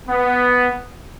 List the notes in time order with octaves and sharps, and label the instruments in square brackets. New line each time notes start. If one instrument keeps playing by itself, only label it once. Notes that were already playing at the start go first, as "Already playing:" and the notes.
[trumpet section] B3